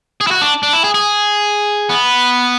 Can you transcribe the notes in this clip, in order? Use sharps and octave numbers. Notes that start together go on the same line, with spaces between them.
G#4
E4
F#4
D4
D4
E4
G#4
G#4
B3